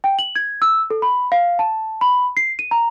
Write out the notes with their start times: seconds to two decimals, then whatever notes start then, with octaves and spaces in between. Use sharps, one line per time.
0.04 G5
0.19 F#7
0.36 G#6
0.62 E6
0.90 A4
1.02 B5
1.32 F5
1.59 A5
2.01 B5
2.37 C7
2.59 D#7
2.71 A#5